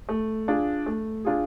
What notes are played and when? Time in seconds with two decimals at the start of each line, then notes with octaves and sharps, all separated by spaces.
0.09 A3
0.48 D4 F4 G#4
0.86 A3
1.25 D4 F4 G#4